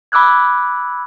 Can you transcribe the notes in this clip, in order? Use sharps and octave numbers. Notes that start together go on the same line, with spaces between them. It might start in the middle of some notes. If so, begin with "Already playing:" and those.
B5 D6 E6 F#6 G#6